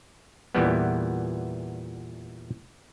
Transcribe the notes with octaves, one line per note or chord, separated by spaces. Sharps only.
E2 A#2 E3 G3 B3